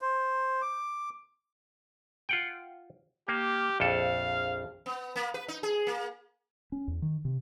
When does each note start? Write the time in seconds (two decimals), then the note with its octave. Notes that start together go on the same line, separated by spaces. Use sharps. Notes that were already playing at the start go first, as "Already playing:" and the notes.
0.01 C5
0.62 D6
2.29 F4 F#5 G5
3.28 A#3 G4
3.80 A#1 F2 A4 F5
4.86 B3
5.16 A#3
5.34 B4
5.48 D#4
5.63 G#4
5.87 A#3
6.72 C#4
6.88 E2
7.02 D#3
7.25 C3